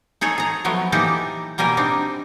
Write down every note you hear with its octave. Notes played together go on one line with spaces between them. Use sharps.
D#4 G#4 A4 C#5
G#4 A#5
F3 F#3 A3 B3
E3 A#3 D#4 G4 A4
B2 G3 A#3 A#4 G#5
C4 D4 D#4